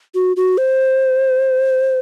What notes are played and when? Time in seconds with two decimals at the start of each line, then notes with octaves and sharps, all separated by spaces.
0.15 F#4
0.36 F#4
0.58 C5